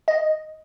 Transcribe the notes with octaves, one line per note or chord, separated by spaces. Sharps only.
D#5